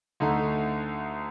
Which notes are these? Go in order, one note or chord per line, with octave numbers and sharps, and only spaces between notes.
D2 D3 A3 D#4